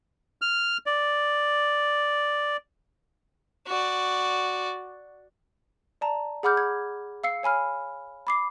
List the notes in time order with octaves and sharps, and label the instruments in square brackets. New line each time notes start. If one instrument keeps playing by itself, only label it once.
[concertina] F6
D5
[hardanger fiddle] F#4 D5
[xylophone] D5 A5 A#5
G#4 F#5 B5 D6 F6 G6
G#6
F5 E6 C7 C#7
C#5 G#5 B5 F6
B5 D6 C7